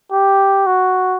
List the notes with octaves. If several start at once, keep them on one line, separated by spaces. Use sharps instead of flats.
G4
F#4